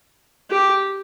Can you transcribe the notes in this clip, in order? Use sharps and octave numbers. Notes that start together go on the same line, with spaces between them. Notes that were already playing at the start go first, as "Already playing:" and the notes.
G4